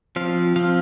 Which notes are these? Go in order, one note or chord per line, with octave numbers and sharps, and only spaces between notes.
F3 C4 F5
F3 C4 F5